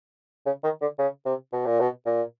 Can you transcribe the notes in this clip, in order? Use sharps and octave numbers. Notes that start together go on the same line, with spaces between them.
C#3
D#3
D3
C#3
C3
B2
A#2
B2
A#2